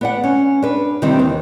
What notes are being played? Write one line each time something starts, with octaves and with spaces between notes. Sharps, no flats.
B3 D5 F#5
C#4
D4 B4
C3 D#3 E3 G3 C4 D4
D#2